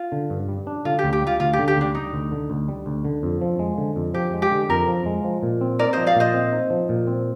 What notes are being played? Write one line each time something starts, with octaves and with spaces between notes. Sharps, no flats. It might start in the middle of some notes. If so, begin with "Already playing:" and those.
Already playing: F4
D3
G2
G3
D4
D3 F4
G4
D2
G4
G3 F4
D2 F4
G4
D3
G4
D2 D4
G3 D#4
D2
D3
D2
G3
D2
D3
F2
F3
G#3
D3
F2
F3 G4
G#3
G4
D3
F2 A#4
F3
G#3
F3
A#2
C4
D#4 A#4 D5
F3 C5 D#5
D5 F5
A#2 C5 D#5
C4
D#4
F3
A#2
C4